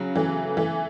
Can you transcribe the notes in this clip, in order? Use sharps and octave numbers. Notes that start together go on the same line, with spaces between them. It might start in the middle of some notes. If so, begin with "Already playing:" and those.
Already playing: C#3 F#3
E3 A3
E3 A3